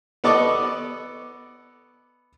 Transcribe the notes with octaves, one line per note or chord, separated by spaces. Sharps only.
B3 A4 D5 D#5 C#6 D6